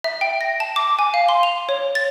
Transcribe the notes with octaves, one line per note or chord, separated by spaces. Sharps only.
E5
G5
A#6
A5
D6
G#5
F5
C6
F7
C#5
A6